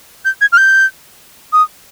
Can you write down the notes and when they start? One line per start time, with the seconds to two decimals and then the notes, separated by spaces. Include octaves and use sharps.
0.25 G6
0.41 G#6
0.52 F6
0.57 G6
1.53 D#6